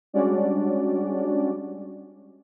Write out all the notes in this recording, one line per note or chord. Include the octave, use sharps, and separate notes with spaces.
G3 G#3 C#4 D4 F#4 D5